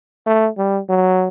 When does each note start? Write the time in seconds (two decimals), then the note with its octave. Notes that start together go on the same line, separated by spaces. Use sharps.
0.27 A3
0.58 G3
0.89 F#3